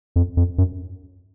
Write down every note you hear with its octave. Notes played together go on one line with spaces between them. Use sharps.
F2
F2
F#2